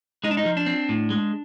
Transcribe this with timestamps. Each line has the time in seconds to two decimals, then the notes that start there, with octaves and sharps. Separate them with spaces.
0.24 G#3 D#4
0.31 D4
0.37 D#4
0.45 F3
0.57 D4
0.66 C4
0.89 A2
1.10 G#3